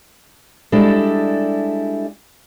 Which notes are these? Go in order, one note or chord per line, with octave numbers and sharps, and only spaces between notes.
G3 G#3 D4 E4 A4